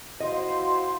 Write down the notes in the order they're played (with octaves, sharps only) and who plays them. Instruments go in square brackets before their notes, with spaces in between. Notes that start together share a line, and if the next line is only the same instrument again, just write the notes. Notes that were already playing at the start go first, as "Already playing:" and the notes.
[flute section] E4 F5 C6 [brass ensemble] F#4 C5 [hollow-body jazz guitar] D#5